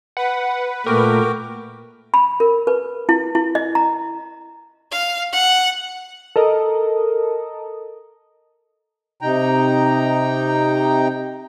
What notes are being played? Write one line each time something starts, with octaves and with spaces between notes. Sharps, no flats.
B4 F#5
A#2 A3 F#4 A#4 G5 D6
B5
A#4
B4
E4
E4
D#5
A#5
F5
F#5
A4 A#4 D#5
C3 D#4 G5 A#5